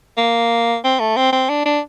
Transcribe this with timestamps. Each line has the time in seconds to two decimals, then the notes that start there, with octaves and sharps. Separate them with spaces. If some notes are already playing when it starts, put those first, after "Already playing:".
0.18 A#3
0.84 C4
1.00 A3
1.17 C4
1.33 C4
1.49 D4
1.66 D4